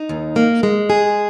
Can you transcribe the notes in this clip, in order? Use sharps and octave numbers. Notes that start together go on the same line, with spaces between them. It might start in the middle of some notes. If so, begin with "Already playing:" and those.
Already playing: D#4
D#2
A#3
G#3
G#4